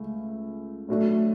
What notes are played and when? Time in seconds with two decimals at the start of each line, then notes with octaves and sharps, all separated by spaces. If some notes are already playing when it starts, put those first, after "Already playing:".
Already playing: C#2 A3
0.88 A2 F#3 A3 D4